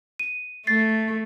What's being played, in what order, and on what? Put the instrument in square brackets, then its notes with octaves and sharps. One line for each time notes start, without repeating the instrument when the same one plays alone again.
[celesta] D#7
[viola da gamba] A3 [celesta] A6 C7